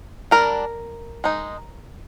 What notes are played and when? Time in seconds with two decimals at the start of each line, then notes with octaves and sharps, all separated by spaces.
0.31 G3 D4 A#4
1.24 G#3 D#4